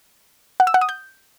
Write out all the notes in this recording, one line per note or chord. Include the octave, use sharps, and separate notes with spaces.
F#5
E6
F#5
D#6
G6